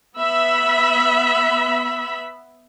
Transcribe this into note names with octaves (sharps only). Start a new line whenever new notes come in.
B3 E5 B5